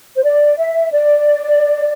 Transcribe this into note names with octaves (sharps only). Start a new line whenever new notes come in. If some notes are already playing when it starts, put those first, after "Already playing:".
C5
D5
E5
D5